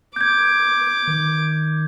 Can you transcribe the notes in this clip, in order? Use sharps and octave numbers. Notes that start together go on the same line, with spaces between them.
D6 G6 G#6
D#3